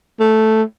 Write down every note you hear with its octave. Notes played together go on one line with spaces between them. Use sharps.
A3